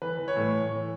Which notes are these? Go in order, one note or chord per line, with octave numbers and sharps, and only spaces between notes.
E3 B4
E3
C#5
A2
A2
E3